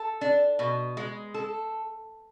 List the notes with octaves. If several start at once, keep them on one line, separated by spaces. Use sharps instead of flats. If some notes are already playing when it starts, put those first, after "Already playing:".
Already playing: A4
D4
B2
G#3
A4